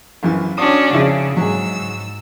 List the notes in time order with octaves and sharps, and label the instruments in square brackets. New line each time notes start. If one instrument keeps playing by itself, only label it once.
[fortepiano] A#1 F#2 E3
[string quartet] C#4 D4 F#4 [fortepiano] D#6
[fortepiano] F2 E4 G#4 [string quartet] C#3
[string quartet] G#2 E6 [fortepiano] F#3 G#4